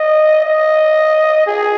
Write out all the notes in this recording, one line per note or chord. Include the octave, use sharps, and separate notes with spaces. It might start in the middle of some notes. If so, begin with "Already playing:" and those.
Already playing: D#5
D#5
G#4